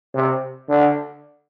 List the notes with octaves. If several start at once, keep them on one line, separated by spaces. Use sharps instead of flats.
C3
D3